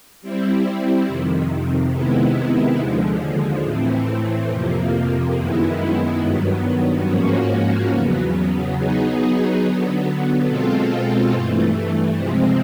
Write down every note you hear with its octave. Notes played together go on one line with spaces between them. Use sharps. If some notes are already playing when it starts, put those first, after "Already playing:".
G3 C4 E4
F2 C3 D#3
C3 D#3 G#3 B3 E4
D#2 D3 F3 G#3
A2 E3 A3 C4
F2 C3 F3 A#3
F#2 D#3 G#3 B3 E4
G2 D#3 F#3 B3
G#2 F3 A#3 C#4 F#4
E2 C#3 F#3 B3
F#3 B3 D#4 G#4
D3 F#3 B3
B2 G#3 C4 F4 A4
G2 E3 A3
C3 F3 G#3 C4